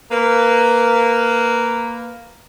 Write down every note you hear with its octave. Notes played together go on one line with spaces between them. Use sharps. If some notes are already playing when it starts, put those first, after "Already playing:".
A#3 B4